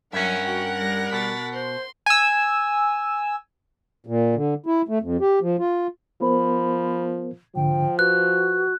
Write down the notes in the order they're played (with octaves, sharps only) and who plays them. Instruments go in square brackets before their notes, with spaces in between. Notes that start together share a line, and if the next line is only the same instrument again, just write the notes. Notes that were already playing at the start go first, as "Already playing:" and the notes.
[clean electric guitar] G2 C#4 [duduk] F#3 [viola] A#4 F#5 [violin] E5 G#5
[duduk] F#4 [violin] G5
[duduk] G3 [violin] A#6
[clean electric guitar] B2 [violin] A6 B6
[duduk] C5 [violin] C6
[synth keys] G#5 E6
[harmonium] A#2
D3
E4
A3
F2
G4
F3
F4
[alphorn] F3 [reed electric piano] B3 A#4 C5 [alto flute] B5
[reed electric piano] C2 G#2 D3 [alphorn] F3 [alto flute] G5
[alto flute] F#4 [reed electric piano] B4 [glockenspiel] F#6